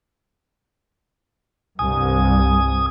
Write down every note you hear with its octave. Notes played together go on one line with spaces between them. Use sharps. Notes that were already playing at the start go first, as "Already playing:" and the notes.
C2 G2 G#5 D#6